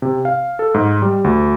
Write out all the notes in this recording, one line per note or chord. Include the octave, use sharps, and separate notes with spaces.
C3
F5
A4
G#2
G3
D2